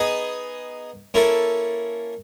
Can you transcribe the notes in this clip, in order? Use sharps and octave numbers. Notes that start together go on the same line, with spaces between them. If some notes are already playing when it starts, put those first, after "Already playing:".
Already playing: B3 D#4 G#4 B4 D#5
A#3 C#4 E4 A4